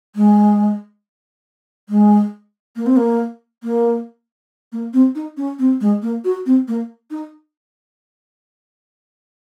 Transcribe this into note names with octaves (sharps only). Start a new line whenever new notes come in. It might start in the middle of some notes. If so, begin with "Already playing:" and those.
G#3
G#3
A#3
C4
A#3
A#3
A#3
C4
D#4
C#4
C4
G#3
A#3
F#4
C4
A#3
D#4